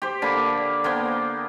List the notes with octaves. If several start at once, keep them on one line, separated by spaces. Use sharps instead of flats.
G4 C5
D3 A#3 B5
A#3 B3 C5 G5